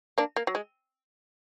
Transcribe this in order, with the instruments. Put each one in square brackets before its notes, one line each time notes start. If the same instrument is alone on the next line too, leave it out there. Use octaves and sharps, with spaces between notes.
[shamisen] A#3 D4
A#3
F#3
G#3